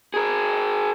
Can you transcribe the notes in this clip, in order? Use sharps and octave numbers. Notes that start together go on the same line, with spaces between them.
G#4 A#4